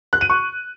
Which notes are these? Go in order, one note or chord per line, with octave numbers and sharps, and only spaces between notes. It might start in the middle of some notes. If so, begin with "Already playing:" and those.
F#6
D#7
C#6